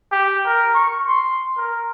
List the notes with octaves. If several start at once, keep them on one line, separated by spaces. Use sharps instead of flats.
G4
A#4
C#6
C6
A#4